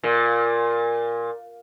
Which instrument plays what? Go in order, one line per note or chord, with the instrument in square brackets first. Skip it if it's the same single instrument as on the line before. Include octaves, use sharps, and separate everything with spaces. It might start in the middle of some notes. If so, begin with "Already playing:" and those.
[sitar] A#2 [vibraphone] A#4